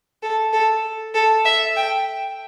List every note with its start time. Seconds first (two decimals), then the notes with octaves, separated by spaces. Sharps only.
0.22 A4
0.53 A4
1.14 A4
1.45 E5
1.76 G5